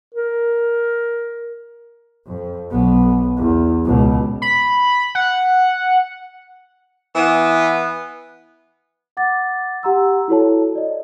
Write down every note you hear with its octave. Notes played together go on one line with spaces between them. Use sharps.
A#4
F2
B1 B3
E2
C#2 B2
B5
F#5
E3 B3
F#5 D6 A6
G4 F#5 A#5 C6 E6
E4 F#4 A4 C#5 A5
D5 D#5